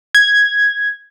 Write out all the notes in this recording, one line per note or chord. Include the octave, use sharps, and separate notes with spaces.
G#6